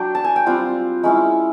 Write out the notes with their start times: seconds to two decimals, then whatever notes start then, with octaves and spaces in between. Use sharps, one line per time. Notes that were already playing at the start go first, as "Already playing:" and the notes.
Already playing: F#3 D4 G5
0.15 A5
0.24 G#5
0.36 G5
0.46 G3 C4 F4 F#5
1.03 G#3 C#4 E4 B5